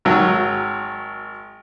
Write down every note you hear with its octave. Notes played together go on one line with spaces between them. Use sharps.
G#1 F#3